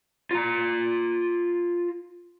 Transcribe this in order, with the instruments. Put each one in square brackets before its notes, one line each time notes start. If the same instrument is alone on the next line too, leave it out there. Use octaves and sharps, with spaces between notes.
[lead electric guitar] F4 A#5